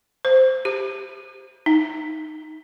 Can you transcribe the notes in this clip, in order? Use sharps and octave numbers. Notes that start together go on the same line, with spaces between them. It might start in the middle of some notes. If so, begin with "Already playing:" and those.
C5
G4
D#4